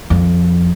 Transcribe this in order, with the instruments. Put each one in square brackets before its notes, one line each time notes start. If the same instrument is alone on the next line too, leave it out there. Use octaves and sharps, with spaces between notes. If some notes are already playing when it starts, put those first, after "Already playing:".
[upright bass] F2